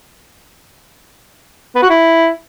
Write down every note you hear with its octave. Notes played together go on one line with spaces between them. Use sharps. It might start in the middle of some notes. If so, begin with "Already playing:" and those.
B3
F#4
E4